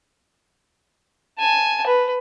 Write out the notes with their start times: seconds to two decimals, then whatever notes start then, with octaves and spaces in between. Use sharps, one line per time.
1.39 G#5 A5
1.86 B4